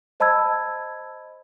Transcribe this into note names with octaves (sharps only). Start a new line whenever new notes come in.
C5 D#5 A5 B5 E6 G#6